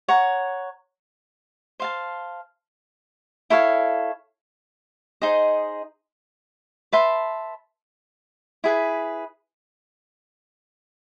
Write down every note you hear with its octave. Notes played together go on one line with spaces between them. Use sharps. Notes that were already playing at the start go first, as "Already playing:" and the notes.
C#5 F#5 A#5
C5 F5 A5
E4 A4 C#5 F5
D#4 G#4 C5 D#5
B4 E5 A5 C6
E4 G#4 B4